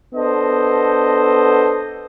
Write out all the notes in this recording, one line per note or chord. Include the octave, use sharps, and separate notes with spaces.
B3 D4 A4 C5 D#5